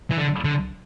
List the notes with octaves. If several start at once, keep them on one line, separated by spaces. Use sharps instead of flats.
E3
D3
D3